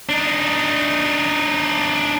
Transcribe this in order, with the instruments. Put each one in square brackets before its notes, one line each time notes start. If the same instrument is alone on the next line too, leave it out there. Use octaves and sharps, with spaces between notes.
[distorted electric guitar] D4 D#4